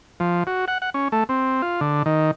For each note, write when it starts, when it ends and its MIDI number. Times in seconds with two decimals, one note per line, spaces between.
0.20 0.43 53
0.47 0.65 66
0.68 0.78 78
0.82 0.90 78
0.94 1.08 61
1.12 1.24 57
1.29 1.62 60
1.62 1.81 65
1.81 2.03 50
2.06 2.31 51